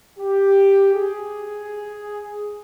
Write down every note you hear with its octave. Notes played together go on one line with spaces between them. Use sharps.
G4
G#4